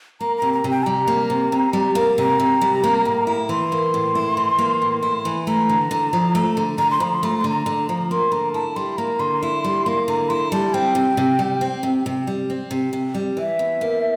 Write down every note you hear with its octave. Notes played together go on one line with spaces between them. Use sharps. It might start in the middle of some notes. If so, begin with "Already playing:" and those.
A#3 A#5
A#5
C3
A#5
C3
G5
G3 A#5
A#3
C3
C3
G3
A#3
C3 A#5
C3
G3
A#3
A2
E4
E3 C6
A#3
A2
E4
E3
A#3
A2
E4
E3
A3 A#5
D3
D3
F3
A3
D3
D3 A#5
C6
F3 A#5
C6
A3 A#5
C6
D3
A#5
D3
F3
A#3 C6
D3 A#5
E4 A5
G3 C6
A#3 A#5
D3 C6
E4
G3
A#3
D3 A#5
E4 C6
G3 A5
C4 G5
C3
C3
G3
C4
C3
C3
G3
C4
C3
C3
G3
E3 E5
E2
A#3